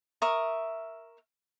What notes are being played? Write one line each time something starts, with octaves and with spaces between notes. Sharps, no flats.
A#4 E5 C#6 D#6